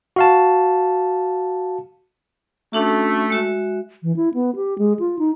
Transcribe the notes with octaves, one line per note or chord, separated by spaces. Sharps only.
F#4 F5 A5
A3 C#4 D4 F#4
G#3 F#4 E5
E3
E4
B3
G4
G#3
F4
D#4